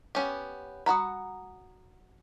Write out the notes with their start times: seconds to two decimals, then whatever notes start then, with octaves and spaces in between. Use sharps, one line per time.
0.15 B3 C#4 G4
0.86 F#4 F#5 A#5 B5 D#6